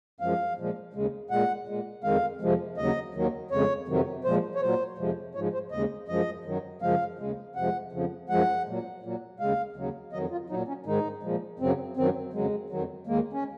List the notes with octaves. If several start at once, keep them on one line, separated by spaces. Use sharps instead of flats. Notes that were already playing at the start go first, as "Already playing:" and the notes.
F#2 F3 G#3 F5
A#2 F3 G#3
D#2 C#3 G#3
A#2 G#3 F#5
A#2 G#3
F2 D#3 G#3 F5
F2 C3 F3 G#3
D#2 C#3 F#3 D#5
D#2 D#3 F#3
F2 C#3 G#3 C#5
F2 C3 D#3 F#3
A#2 F3 G#3 C5
C#5
A#2 F#3 C5
F2 C3 F3 G#3
G#2 F3 G#3 C#5
C5
D#2 C#3 G#3 D#5
F#2 F3 G#3 D#5
F#2 D#3 F#3
F#2 C#3 F3 G#3 F5
D#2 C#3 G#3
F2 C3 F3 G#3 F#5
F2 C#3 F3
F#2 F3 G#3 F#5
A#2 F#3
A#2 F#3
D#2 C#3 G#3 F5
D#2 C#3 F#3
F2 D#3 F#3 D#5
F4
A#2 F#3 D#4
C#4
G#2 D#3 G#3 D#4
A#2 F3 G#3
F#2 C#3 F#3 C4
F#2 D#3 F#3 C4
F2 C#3 F#3 G#3
F2 D#3 F#3
D#2 D#3 G#3 A#3
C#4